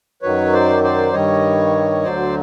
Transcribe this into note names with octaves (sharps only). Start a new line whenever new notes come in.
F#2 D#3 F#3 B4 C#5
C5 D5
C5 D5
G2 D#3 G3 C#5 D#5
D2 D3 F#3 C5 D5